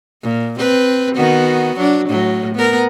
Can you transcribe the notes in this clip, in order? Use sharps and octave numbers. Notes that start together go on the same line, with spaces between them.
A#2
C4 B4
D#3 B3 F#4
F#3 D4
A2 F#3
B3 A#4